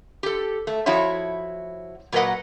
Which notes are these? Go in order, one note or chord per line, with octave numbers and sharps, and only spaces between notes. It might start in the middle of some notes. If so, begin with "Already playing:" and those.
G4 A4
A3
F3 E4 F#4 C#5 E5
A#2 F#3 A#4 B4 D#5 F#5